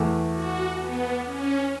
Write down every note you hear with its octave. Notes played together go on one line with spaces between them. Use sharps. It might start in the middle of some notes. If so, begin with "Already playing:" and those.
Already playing: E2 E3 A3
F#4
B3
C#4